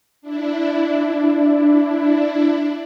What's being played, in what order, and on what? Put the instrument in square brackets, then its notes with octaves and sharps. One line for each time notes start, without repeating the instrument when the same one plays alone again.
[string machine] D4 E4